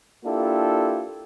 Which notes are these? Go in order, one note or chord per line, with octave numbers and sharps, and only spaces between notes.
A#3 D4 E4 F4 G4 A4